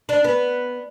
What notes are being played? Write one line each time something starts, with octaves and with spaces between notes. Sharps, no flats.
D4
B3